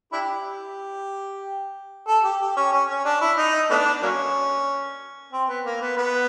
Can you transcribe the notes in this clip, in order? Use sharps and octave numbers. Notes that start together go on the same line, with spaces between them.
D4 E4 G4
A4
G4
G4
C#4
C#4
C#4
D4
E4
D#4
A3 B3 D4
F#3 A#3 C#4
C4
B3
A#3
B3
B3